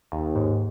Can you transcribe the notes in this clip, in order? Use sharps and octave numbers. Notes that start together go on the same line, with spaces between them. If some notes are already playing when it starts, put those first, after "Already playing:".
D#2
G#2